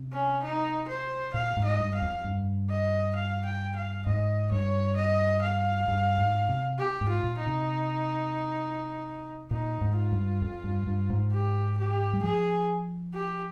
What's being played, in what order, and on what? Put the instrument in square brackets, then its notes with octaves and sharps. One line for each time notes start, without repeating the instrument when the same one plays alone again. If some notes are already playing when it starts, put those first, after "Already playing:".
Already playing: [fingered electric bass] C3
[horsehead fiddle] C#4
D#4
C5
[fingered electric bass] A#2 [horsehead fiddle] F5
[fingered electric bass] G#2
[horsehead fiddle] D#5
[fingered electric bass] G2
[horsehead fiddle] F5
[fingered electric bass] F2
G2
[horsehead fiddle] D#5
F5
G5
F5
[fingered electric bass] G#2 [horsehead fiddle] D#5
[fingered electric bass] G2 [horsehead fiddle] C#5
[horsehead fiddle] D#5
F5
[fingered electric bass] G2
G#2
C3
[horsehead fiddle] G4
[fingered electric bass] G#2
[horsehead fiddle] F4
[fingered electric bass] A#2
[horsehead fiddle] D#4
[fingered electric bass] C3
[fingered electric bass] A#2 [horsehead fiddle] D#4
[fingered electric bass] G#2
[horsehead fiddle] F4
[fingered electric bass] G2
F2
G2
G2
G#2
[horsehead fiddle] G4
G4
[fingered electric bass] G3
[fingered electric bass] F3 [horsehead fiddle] G#4
[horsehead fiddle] G4